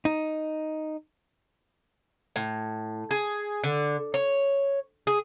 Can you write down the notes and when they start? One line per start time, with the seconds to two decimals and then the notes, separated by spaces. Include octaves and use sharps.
0.05 D#4
2.36 A2
3.11 G#4
3.64 D3
4.14 C#5
5.07 G#4